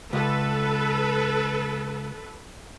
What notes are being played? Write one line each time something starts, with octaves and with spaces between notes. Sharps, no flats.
C#2 A4 B4